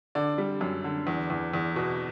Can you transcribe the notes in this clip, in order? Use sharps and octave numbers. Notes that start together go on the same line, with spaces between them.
D3 D5
G3
F#2
D3
E2
E2
E2
B2